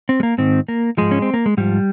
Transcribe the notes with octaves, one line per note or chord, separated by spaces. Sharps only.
C4
G#3
A#3
G#2 D#3 C4
A#3
G#2 F3 G#3
C#4
C4
A#3
G#3
G#2 F3 G3